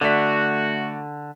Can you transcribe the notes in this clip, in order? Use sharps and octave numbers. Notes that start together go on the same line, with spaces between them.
D3 A3 F#4 D5 B6